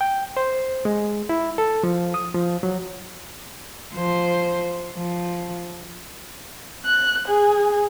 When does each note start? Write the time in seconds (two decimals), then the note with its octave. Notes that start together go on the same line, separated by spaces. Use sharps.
0.01 G5
0.37 C5
0.85 G#3
1.29 E4
1.58 A4
1.83 F3
2.14 D#6
2.35 F3
2.63 F#3
3.94 F3 C5
4.93 F3
6.85 F#6
7.28 G#4